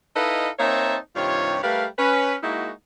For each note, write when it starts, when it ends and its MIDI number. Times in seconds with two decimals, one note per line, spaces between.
0.16 0.49 63
0.16 0.49 64
0.16 0.49 69
0.16 0.49 71
0.16 0.49 75
0.16 0.49 77
0.59 0.97 58
0.59 0.97 60
0.59 0.97 63
0.59 0.97 73
0.59 0.97 76
0.59 0.97 81
1.16 1.58 43
1.16 1.58 48
1.16 1.58 51
1.16 1.58 65
1.16 1.58 73
1.62 1.85 55
1.62 1.85 57
1.62 1.85 70
1.62 1.85 71
1.62 1.85 77
1.99 2.36 61
1.99 2.36 71
2.43 2.70 56
2.43 2.70 58
2.43 2.70 63
2.43 2.70 64
2.43 2.70 66